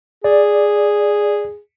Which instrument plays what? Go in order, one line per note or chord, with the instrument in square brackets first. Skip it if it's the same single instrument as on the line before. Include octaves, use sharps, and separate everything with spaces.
[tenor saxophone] G#4 [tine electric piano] D5